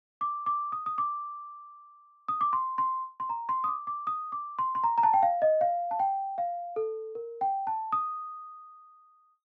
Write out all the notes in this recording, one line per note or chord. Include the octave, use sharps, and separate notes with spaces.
D6
D6
D#6
D#6
D6
D#6
D6
C6
C6
C6
A#5
C6
D#6
D6
D6
D#6
D6
C6
C6
A#5
A#5
A5
G5
F5
D#5
F5
A5
G5
F5
A4
A#4
G5
A5
D#6